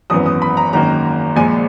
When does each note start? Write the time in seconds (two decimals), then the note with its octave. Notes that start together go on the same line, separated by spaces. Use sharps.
0.10 G#1 F#2 E3 B3 D#6
0.26 D#6
0.42 B5
0.57 A#5
0.73 G#1 F#2 D#3 A#3 A#5
1.36 A#1 A#2 G#3 G#5